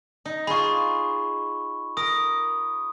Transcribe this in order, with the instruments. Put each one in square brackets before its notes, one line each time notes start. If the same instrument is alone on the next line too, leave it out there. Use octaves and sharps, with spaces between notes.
[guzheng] D#4
[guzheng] F4 G#4 [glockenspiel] B5 C#6
[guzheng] A#4 [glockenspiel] D#6